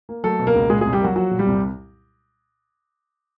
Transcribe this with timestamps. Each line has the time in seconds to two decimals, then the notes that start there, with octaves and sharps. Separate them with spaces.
0.09 A#3
0.24 F#3 A3 A4
0.39 B2
0.47 A#3 A#4
0.55 C#2
0.70 A#2 G#3 G#4
0.81 C2 G#3 G#4
0.93 G3 G4
1.01 F#3 A#3 F#4
1.15 F3 F#3 F#4
1.31 A#2
1.39 G3 G4
1.47 C2